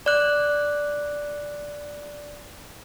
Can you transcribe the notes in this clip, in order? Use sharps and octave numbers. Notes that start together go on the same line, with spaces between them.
D5 F#6